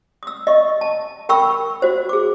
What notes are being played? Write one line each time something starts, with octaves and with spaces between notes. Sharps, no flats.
D#6 E6
D#5 C#6
A5
A#4 G5 B5 C#6 E6
F#4 C5
G#4 D6